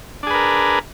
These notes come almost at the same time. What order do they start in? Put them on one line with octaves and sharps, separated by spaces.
D4 G#4 B4 A#4